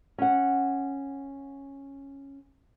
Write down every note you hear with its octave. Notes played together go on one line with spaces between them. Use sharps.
C#4 F#5